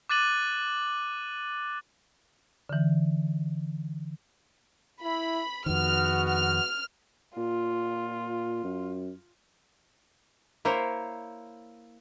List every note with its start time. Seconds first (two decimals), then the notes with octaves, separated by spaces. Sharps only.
0.09 D6 F#6 A6 D#7 F#7
2.69 D3 E3
5.02 E4 B5
5.66 F2 D#3 G#3 B3 F#4 F6
6.28 F6
7.37 A#2 F4
8.64 F#2
10.65 A#3 E4 A#4 C5 C#5